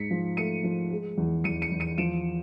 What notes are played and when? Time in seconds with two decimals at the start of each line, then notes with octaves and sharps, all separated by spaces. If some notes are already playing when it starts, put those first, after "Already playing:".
Already playing: G#2 B6 C#7
0.10 F3
0.37 A3 C#7 D#7
0.64 F3
0.90 G#3
1.18 E2
1.44 E2 C#7 D#7
1.62 C#7 D#7
1.72 E2
1.80 C#7 D#7
1.98 F3 D7 E7